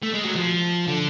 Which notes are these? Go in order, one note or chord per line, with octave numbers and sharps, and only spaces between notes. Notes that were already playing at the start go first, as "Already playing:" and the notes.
A3
G#3
F#3
F3
D3